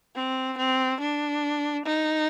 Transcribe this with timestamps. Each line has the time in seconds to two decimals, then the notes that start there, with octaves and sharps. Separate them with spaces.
0.15 C4
0.58 C4
1.00 D4
1.85 D#4